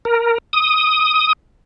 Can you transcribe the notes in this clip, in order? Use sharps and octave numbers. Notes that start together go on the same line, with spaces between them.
A#4
D#6